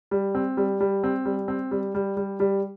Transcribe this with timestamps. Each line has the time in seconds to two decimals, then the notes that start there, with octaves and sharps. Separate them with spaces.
0.11 G3
0.35 C4
0.57 G3
0.80 G3
1.04 C4
1.25 G3
1.48 C4
1.71 G3
1.95 G3
2.17 G3
2.40 G3